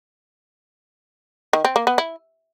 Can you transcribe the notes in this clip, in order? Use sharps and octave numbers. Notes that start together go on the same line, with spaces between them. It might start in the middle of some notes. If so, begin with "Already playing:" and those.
D#3
C4
A#3
B3
E4